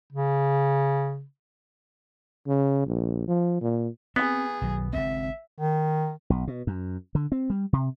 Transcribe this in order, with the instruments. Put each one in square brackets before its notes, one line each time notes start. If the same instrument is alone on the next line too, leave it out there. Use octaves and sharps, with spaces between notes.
[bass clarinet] C#3
[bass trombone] C#3
A#1
F3
A#2
[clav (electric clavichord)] B3 [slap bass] C4 [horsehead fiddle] G#4
[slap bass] B1 D#3 F#3
[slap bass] G#1 C#3 C4 [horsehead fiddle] E5
[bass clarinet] D#3
[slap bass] B1
B2
F#2
D3
C4
G3
C3